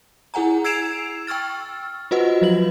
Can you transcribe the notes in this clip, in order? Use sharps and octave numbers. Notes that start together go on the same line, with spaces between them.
E4 G#4 F#5 G#5 A#5
E6 G#6 C7 D7 E7 F7
G5 C#6 E6 F6 A6
F4 F#4 B4 C5 D#5 F#5
F3 F#3 B4 F#7